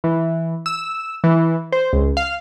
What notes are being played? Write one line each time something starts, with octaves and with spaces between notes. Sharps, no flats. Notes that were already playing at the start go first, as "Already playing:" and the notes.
E3
E6
E3
C5
C#2
F5